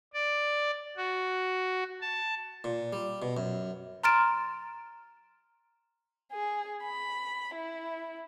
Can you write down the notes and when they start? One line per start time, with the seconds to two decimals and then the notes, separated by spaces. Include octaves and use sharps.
0.13 D5
0.97 F#4
2.02 A5
2.64 A#2
2.93 G3
3.22 B2
3.37 F#2
4.03 A#5 C6 F6 A6 D7 E7
6.33 G#4
6.84 B5
7.55 E4